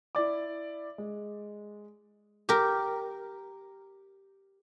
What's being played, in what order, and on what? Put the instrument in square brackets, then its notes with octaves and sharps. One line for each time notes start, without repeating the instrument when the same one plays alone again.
[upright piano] E4 D5 D6
G#3
[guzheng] G4 A#4